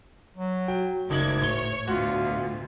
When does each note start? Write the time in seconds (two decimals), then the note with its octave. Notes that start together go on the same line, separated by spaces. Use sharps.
0.36 F#3
0.68 F#4 G5
1.10 F#1 D2 G#2 D#4 D5 G#6 F#7
1.42 A2 C#5 G#6 G7
1.88 D2 B2 F4 F#4